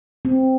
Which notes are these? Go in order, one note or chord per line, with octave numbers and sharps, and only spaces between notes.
C4